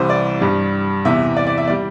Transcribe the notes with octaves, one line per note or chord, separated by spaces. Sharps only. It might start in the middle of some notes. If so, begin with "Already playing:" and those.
Already playing: C2 C3 E3 G3 C5
D5
G2 G3
E2 C3 E3 E5
D5
D5
E5
G3 D5